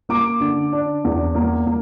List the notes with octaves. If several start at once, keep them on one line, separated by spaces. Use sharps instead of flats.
A#3 D6
D3
D4
E2
A#3
A#3